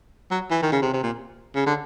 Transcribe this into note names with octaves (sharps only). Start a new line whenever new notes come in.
F#3
E3
D#3
C#3
C3
C3
A#2
C#3
D3